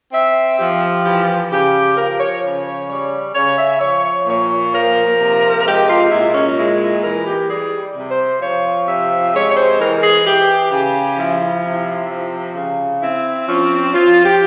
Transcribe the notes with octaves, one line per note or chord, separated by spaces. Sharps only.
C4 E5
F3 G4
E3 G4
C#3 G4
F3 A#4
C#5
C#3
C#5
G3 C#5
C#3 C#5
E5
F3 C#5
A#2 C#5
F3 A#4
C3
G#3 G4
F4
A#2 E4
C#4
G#3 E4
E4
E3 A#4
G4
G3 G#4
C3
C5
F3 C#5
C3 E5
G#3 C#5
C#5
C5
E3 A#4
G#4
E3 G4
C#3 G4
F3 E4
C3 E4
F3
C#3
C4 E4
F3 C#4
F3 F4
G4